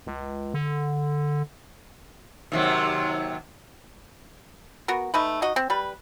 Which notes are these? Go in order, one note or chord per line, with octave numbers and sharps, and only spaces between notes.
C#2
D3
D#2 C3 F#3
B3 F#4 A#4
A3 D#4 B4
D#4 F#4 D#5
C4
G3 B4